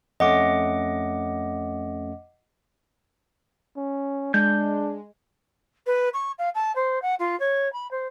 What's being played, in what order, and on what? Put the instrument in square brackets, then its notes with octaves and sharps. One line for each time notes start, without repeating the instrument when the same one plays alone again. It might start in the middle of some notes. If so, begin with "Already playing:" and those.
[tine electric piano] F2 A3 C#4 [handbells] D#5 F#5 D6
[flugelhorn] C#4
[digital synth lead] G#3 [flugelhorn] D4 [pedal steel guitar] G6
[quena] B4
C#6
F5
A5
C5
F#5
F4
C#5
B5
C5